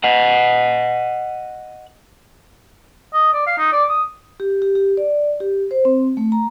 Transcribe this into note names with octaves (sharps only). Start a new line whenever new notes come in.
D#5 F#5
D#5
D5
F5
D#4
D5
D#6
G4
G4
G4
D5
G4
C5
C4
A3
A#5